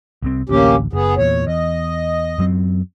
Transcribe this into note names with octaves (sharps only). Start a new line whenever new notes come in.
C2 C3 C4
A1 D2 A#3 C#4 G4
F#1 B3 G#4
E2 A#2 C#5
E2 D#5
F#2 F#3 C4